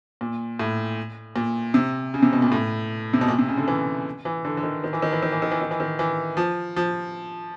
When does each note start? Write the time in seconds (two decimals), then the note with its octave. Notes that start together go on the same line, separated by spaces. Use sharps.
0.21 A#2
0.59 A2
1.36 A#2
1.74 C3
2.14 C#3
2.22 C3
2.33 B2
2.42 A#2
2.52 A2
3.13 C3
3.21 B2
3.28 A#2
3.39 C3
3.48 C#3
3.57 D3
3.67 E3
4.25 E3
4.45 D3
4.57 D3
4.63 D#3
4.84 D#3
4.93 E3
5.02 D#3
5.12 E3
5.23 D#3
5.32 E3
5.42 D#3
5.51 E3
5.61 D#3
5.71 E3
5.80 D#3
5.99 E3
6.37 F3
6.76 F3